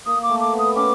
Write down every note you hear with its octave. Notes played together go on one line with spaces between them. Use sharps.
A#3 D#6
D6
A3
D6
B3
D#6
C#4 D6